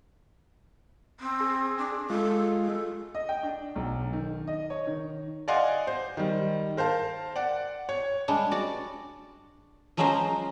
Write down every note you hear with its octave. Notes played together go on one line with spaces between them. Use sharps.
C4
G#4
D4
G#3 F4 A4
A4
D#5
G5
D4
B1
D#3
D#5
C#5
D#3
D5 D#5 F5 F#5 G#5 C6
C5
D#3 G3
A#4 C5 F5 A5
D5 F#5
C#5
G3 G#3 D4
F#4 D5
F3 F#3 G#3 C#4 A#4 C5